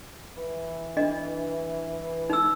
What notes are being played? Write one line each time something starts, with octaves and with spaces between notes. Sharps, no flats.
E3
D4 D#5
D#4 E6